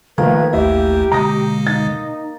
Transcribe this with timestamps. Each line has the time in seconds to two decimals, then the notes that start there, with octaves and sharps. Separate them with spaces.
0.18 D#3 F3 A3 A#3 B4 G#6
0.53 A1 D#2 A3 E4 G4 E5
1.12 B2 D3 G#3 A#5 D#6 A#6
1.67 D#4 A6